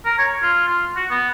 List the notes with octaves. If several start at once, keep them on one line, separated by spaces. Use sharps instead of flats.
A#4
C#5
F4
F4
F#4
B3